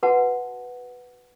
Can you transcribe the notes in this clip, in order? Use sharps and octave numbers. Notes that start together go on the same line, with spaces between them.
F#4 B4 F#5 A5